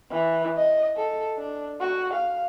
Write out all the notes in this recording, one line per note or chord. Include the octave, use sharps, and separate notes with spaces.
E3
D#5
A4
D4
F#4
F5